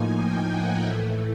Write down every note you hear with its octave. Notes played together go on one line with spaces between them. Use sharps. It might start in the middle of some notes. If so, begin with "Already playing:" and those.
Already playing: A2 F3 A#3 D#4 G#5
G5
F#5
A2 E3 A3 E5